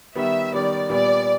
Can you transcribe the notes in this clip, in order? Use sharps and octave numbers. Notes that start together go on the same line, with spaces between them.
D#3 G3 B3 E5
D#3 G3 B3 D5
A#2 G3 B3 D5